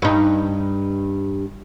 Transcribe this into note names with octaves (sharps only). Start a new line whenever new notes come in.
G2 D#4